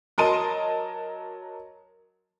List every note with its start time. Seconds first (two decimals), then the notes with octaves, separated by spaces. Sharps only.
0.18 F#3 A#4 D#5 A5 C6 D#7